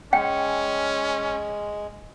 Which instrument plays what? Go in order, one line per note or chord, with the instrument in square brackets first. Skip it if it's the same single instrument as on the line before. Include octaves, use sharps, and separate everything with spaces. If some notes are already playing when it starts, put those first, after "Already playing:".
[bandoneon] G#3 [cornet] C#4 [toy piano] G5